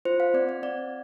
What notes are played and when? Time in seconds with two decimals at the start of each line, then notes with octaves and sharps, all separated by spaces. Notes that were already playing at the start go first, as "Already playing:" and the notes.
0.05 F4 C5
0.20 F5
0.34 C4 D5
0.49 D5
0.63 C4 D5